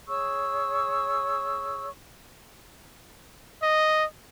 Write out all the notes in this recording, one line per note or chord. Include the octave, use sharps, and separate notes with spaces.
G#4 C#5 C#6 E6
D#5